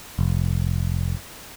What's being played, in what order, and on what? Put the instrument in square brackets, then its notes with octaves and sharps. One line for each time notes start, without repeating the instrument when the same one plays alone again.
[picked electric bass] F1